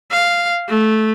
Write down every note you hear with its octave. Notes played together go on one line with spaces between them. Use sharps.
F5
A3